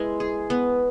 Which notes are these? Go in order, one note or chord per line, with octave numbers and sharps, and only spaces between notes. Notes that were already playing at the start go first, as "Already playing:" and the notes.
Already playing: G#3 B3 E4
G#4
B3